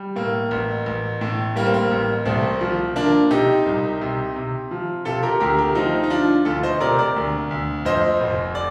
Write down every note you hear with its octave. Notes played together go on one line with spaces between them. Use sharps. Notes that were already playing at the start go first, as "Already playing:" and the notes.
Already playing: G3
A2 A#3
A1
A1
A2
G3 A#3
C4
A#3
A1
C2 A3 C4
F3
F3 A#3 D4
C3 D#4 G4
C2
C3
C3
F3
C3 F4 A4
G4 A#4
D2 G4 A#4
G4 A#4
F3 C4 D#4
D#4
F3 D4 F4
D2 F4 A4
C5 D#5
C3 A#4 D5
A#4 D5
D2
D2
F2 C5 D#5
F1
D5